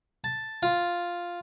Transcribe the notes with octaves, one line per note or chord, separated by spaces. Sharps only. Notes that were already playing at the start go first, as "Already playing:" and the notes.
A5
F4